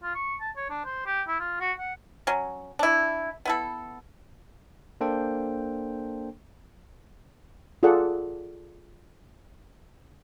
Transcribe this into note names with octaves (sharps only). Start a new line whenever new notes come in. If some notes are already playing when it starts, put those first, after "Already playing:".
F4
C#6
A5
C#5
D4
C5
G4
E4
F4
F#4
F#5
F#3 C#4
D4 E4
B3 E4 A4
A#3 D4 A4 C5 G5
F4 G#4 A4 D5 F#5